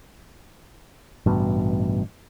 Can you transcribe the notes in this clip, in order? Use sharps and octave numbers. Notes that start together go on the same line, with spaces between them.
A1 G2 B2